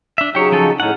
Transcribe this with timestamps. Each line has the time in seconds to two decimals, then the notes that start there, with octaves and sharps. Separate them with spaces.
0.18 D4 E5
0.35 C#3 F#3 D#4 G4 C#5
0.52 F3 C#4 A4
0.80 A2 C#4 D#4 F#5